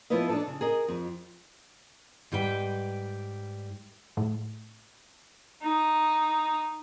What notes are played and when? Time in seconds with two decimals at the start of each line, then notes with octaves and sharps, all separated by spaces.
0.10 F3 B3 E4 F4 B4 D#5
0.29 D4 D#4 A4
0.47 C#3
0.61 G#4 A#4 D#5
0.88 F2
2.32 G#2 G3 B4 G5
4.17 A2
5.63 D#4